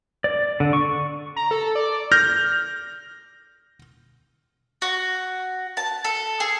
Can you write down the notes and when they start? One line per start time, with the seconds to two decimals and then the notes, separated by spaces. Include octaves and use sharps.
0.24 D5
0.60 D3
0.73 C#6
1.36 A#5
1.51 A4
1.75 D5
2.12 F6 G6 A#6
4.82 F#4
5.77 A5
6.04 A4
6.40 G#4